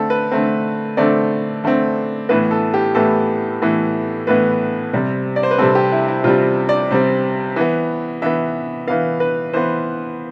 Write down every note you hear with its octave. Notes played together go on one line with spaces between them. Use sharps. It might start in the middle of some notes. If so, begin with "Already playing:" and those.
Already playing: D3 A3 C4 A4
B4
D3 A3 C4
D3 A3 C4 D5
D3 A3 C4
A2 E3 B3 B4
A4
G4
A2 E3 B3 A4
A2 E3 B3
A2 E3 B3 B4
C3 G3 C4
D5
C5
B4
C3 G3 C4 A4
G4
E4
E4
C3 G3 C4 F4
D5
C3 G3 C4
E3 B3
E3 B3 E5
E3 B3 F5
B4
E3 B3 C5